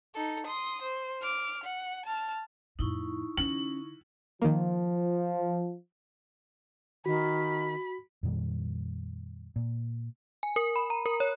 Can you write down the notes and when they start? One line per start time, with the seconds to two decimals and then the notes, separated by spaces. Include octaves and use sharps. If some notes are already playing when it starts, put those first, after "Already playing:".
0.15 D#4 A4
0.47 C6 D#6
0.82 C5
1.22 D6 F6
1.64 F#5
2.06 A5 F6
2.79 F2 A2 D#4 E4 C#6
3.37 D3 E3 C#4 F#7
4.42 D#3 F3 A#3
7.06 D#3 F#4 B5
8.23 F2 A#2 D#3 G3
9.56 A#2
10.43 G#5
10.56 A#4
10.76 B5
10.90 A#5
11.06 A#4
11.20 C#5